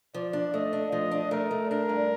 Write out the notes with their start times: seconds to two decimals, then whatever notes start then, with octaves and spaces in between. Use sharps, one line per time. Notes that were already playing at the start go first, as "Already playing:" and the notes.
0.14 F3 D5
0.33 D4
0.54 A3 D#5
0.73 D4
0.92 F3 D#5
1.11 D4
1.31 A3 A#4
1.51 A3
1.70 D4 A#4
1.89 G2